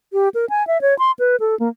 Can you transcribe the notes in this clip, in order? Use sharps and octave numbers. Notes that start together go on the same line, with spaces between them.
G4
A#4
G#5
E5
C#5
C6
B4
A4
A#3